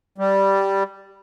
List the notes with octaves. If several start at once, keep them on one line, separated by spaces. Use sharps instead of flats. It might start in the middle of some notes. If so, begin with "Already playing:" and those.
G3